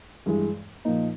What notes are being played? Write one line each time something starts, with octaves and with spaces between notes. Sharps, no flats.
G2 E3 G#3
A#2 F3 A#3 D#4